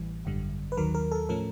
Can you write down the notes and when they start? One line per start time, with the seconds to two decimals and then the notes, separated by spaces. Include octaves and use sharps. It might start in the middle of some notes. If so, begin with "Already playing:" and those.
Already playing: A1 A2 E3 G3
0.25 G#1 F#2 D3 G3
0.72 B4
0.77 D#2 D#3 F#3 A#4
0.95 A#4
1.12 A4
1.29 A2 F3 A3 C#4 A#4